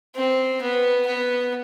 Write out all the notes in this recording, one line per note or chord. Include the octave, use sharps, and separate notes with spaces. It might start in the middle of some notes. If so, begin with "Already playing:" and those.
C4
B3
B3